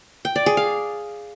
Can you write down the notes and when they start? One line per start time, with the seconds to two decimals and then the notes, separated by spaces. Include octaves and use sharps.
0.25 G5
0.36 D5
0.46 G#4
0.57 F5